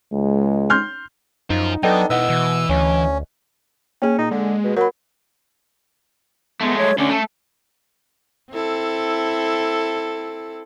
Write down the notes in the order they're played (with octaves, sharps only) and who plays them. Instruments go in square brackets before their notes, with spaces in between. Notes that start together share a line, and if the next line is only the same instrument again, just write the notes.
[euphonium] C#2 [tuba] G#3
[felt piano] C6 F6 G6
[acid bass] F#2 [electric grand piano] D#4 [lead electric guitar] F4 C5
[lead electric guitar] F#3 [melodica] B3 D4 [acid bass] D#4 [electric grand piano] A4 D#5 G5
[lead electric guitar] B2 E4 [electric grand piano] B4 D#5 F#5 [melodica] E6
[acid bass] B2 [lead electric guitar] E3
[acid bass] D2 [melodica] C#4
[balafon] A#3 G#4 [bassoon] C#4
[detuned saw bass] A#2 [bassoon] D#4
[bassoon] D3 [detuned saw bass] G#3
[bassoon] B2
[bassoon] F#3 [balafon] A#4 B5
[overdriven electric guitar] G#3 A3 [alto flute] B3
[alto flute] C#5
[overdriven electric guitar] D2 D3 [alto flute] C#4
[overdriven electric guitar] A3 A4
[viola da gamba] C4 E4 A4